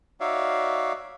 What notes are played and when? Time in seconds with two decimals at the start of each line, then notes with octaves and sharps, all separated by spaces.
0.20 D#4 F#4 C#5 D5 E5 F5